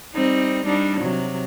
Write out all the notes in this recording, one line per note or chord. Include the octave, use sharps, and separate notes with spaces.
G3 C4 D#4
G3 D4 D#4
C3 F#3